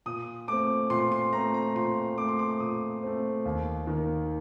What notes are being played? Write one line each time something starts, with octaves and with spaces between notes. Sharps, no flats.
A#2 D#6
A3 C4 D6
A#2 C6
C6
A3 C4 A#5
A#5
A#2 C6
A3 C4 D6
C6
D6
A#2 D#6
A3 C4
D#2
D#3 A#3